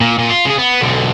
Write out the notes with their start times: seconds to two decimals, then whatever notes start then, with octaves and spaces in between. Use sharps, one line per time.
0.01 A#2
0.19 A#2
0.30 F4
0.46 C#3 G#4
0.58 B3
0.81 B1 D3